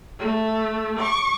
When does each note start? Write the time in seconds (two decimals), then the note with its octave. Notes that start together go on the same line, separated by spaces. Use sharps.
0.19 A3
0.98 C#6 D6